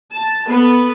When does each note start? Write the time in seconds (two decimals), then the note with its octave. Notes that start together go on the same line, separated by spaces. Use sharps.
0.14 A5
0.49 B3 A4 B4